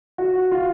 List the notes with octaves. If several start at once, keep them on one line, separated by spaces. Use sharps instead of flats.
F#4
F4